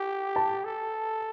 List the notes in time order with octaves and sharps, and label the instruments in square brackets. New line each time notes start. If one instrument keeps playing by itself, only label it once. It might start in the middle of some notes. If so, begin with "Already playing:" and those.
Already playing: [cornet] G4
[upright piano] A5
[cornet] A4